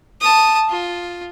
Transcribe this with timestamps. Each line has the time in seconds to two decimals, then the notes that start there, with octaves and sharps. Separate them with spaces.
0.21 A5 D#6
0.69 F4